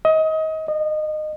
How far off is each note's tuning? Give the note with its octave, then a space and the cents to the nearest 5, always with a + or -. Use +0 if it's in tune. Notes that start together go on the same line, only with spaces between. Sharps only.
D#5 +25
D#5 -25